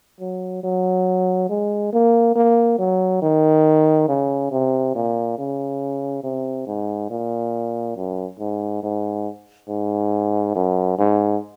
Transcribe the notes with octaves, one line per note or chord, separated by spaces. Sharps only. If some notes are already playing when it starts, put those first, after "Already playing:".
F#3
F#3
G#3
A#3
A#3
F#3
D#3
C#3
C3
A#2
C#3
C3
G#2
A#2
F#2
G#2
G#2
G#2
F#2
G#2